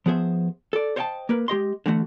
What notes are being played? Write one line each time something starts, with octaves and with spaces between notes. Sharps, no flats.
F3 B3 G#4 C5 E5
A4 D5
C5 C#5 D#5 F5 G5 A5
A#3 A#4 B4
G#3 G4 D#5 C6
D3 E3 A3 F#4